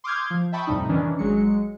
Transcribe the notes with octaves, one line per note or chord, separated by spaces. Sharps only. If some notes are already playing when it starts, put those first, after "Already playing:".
C6 D6 D#6 F6 G6 G#6
F3
E5 G5 A5 B5 C#6 D#6
F2 A2 C3 G3 D#4
D#3 E3 C#4 D4
G#1 F#3 G#3 C#7